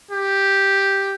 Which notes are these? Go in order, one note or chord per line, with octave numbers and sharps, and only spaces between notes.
G4